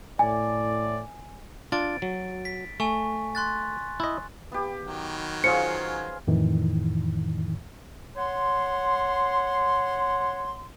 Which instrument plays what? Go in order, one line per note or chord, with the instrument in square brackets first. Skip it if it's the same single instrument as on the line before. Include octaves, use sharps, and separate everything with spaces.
[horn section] A2 D5 [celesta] G#5
[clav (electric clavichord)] D4 F4 [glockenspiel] A6 D7
[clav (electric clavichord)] F#3
[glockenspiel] B6
[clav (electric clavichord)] A3 [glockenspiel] G#5 C#6
[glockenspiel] C6 F#6 A6
[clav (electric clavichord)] E4 D#5
[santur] B3 G4
[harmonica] D#3 F#3
[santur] C#4 F4 G#4 [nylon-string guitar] C5 [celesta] C#7
[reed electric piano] F2 A2 D#3 E3
[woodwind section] C#5 F#5 C6